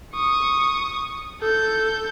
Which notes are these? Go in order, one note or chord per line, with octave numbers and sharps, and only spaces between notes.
C#6 D#6
A4 G6